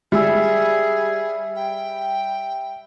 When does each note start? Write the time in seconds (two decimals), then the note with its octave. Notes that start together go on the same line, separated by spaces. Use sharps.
0.12 G3 G#4 E5 E6
1.56 G5